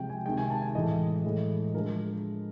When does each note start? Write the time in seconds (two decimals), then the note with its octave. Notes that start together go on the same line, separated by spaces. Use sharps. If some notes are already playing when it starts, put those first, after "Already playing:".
Already playing: C3 F3 G#3 G5
0.09 G#5
0.25 C3 D#3 G#3 G5
0.38 G#5
0.50 A5
0.62 G#5
0.75 A2 E3 G#3 D#5
1.24 A2 E3 G#3
1.74 D3 F3 G#3 A#4